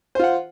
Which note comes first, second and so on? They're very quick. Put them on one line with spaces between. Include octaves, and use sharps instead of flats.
C5 F4 F#5